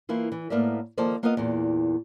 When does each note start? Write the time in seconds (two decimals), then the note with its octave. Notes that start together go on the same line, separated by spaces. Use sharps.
0.09 E3 A#3 E4 F4
0.32 E3
0.50 A2 A#3 B3 A#4 D5 E5
0.98 D#3 F3 A#3 A4 C5 D5
1.23 A#3 B3 F4 A#4 D#5 F5
1.37 E2 A#2